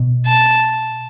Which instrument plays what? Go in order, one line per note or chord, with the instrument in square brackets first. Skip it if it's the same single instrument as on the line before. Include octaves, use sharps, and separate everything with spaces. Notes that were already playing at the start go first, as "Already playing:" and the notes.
Already playing: [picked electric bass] B2
[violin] A5